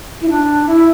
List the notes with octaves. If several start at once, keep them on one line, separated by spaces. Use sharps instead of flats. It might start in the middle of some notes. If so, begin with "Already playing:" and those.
E4
D4
E4